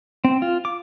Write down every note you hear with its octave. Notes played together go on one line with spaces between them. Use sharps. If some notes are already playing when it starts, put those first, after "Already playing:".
C4
F4
D6